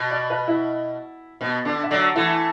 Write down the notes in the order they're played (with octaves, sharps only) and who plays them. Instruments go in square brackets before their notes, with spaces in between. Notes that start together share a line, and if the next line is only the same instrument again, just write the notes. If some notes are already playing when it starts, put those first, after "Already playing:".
Already playing: [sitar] B2
[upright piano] D5
B4
E4
[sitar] B2 [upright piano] B3
[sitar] D3 [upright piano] D4
[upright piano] E5
[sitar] D3 F#3 [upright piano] D5
[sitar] E3 A3 [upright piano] E4